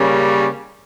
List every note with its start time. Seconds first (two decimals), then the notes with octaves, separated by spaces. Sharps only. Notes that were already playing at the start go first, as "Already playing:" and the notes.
Already playing: C#3 G3 A#3 C#4